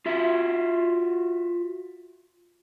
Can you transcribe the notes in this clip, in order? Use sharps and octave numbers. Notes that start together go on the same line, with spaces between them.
F4 F#4 E5